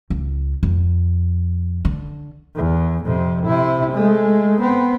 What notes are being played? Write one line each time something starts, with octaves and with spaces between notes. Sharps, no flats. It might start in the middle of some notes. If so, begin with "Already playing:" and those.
C#2
F2
D3
E2
F2 C3
C3 E4
G#3 A3
B3 C4